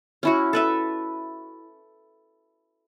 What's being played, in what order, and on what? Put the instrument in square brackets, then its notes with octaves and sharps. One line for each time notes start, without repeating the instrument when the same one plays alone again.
[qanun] C#4 E4 F#4
A4 B4 E5